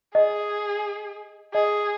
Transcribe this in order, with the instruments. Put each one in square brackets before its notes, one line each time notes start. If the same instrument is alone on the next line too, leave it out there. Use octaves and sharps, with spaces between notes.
[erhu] G#4 [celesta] D#5
[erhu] G#4 [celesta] D#5